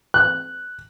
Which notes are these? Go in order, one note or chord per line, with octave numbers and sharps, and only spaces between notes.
F#6